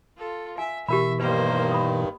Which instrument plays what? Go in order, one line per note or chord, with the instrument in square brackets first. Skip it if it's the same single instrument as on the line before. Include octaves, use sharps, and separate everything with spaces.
[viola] F4 A4
[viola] E5 [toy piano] G#5
[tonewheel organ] B2 E3 [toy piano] G4 A#4 B5 [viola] E5
[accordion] G2 D#3 [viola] A#3 C5 [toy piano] B4
[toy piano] B5 D#6